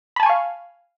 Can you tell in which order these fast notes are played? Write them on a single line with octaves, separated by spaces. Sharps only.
B5 A5 G#5 C#6 F5